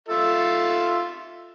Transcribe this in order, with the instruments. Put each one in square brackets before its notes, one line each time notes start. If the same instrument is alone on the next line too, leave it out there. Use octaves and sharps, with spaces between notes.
[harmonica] F4 A4 E5